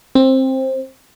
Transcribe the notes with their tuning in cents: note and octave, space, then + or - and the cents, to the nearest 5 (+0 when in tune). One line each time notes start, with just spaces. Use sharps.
C4 +15